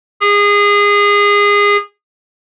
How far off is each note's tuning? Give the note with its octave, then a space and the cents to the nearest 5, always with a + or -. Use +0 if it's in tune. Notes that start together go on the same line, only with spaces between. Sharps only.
G#4 -25